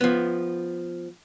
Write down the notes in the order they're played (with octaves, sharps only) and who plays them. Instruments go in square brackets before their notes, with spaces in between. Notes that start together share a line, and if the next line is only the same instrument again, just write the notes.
[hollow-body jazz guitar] F3 B3